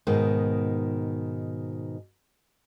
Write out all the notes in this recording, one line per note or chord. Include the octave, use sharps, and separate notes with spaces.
G#2 B2 D#3